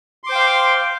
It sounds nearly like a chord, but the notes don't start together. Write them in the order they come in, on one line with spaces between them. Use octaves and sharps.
C6 D6 C5 G5 F5